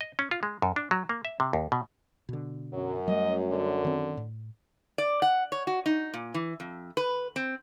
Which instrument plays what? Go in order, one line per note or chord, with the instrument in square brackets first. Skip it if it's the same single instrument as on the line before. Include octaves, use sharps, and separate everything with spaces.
[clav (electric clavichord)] D#5
C#4
F4
G#3
F#2
D4
F#3
A#3
E5
C3
D#2
B2
[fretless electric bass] B2 D3
[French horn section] F#2 [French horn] F#3
[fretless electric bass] F#3 G3 A3 [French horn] D#5
[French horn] D3
[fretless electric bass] D#3 C4
A2
[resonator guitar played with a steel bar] D5
F#5
C#5
F#4
D#4
A#2
E3
F2
B4
C4